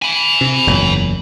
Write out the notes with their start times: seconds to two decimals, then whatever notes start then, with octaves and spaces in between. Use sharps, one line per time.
0.02 G#5 B5
0.41 C3
0.67 F#1 E2 A#2